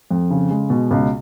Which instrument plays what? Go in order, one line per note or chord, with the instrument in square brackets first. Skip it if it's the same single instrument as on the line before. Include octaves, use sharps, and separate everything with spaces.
[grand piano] F2
C#3
G#3
B2
C#2